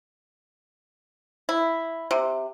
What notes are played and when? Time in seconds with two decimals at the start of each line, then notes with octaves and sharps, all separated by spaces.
1.49 E4
2.11 C3